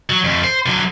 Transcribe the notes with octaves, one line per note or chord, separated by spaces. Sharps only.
F#3
F2 A3
C5
D3 F#3